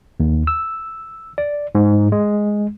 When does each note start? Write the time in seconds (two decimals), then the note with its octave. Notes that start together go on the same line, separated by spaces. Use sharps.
0.20 D#2
0.47 E6
1.38 D5
1.75 G#2
2.12 G#3